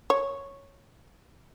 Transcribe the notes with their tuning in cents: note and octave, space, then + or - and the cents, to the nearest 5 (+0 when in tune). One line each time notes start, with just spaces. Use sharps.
C#5 -5